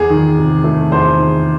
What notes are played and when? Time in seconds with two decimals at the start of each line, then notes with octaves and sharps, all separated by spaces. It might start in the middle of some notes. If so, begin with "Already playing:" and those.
Already playing: E2 G#4
0.10 D#3
0.38 C3
0.64 A3
0.92 E2 C5
1.18 D#3